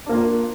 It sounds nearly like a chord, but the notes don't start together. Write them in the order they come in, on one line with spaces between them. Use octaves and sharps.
D4 A#3 F4